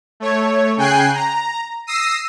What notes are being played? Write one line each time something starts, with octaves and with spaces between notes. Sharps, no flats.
A3 C#5
C#3 G5 G#5 F#6 C7
A#5
D#6 E6 A#6 C7 D#7